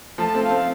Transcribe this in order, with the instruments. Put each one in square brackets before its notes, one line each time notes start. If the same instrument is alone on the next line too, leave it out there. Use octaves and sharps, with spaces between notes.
[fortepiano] F3 A3 [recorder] A5
[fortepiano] A3 C4
[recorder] F5
[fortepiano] A3 C4